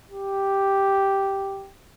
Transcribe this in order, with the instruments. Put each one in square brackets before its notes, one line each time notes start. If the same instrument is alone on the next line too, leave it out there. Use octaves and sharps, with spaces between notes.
[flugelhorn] G4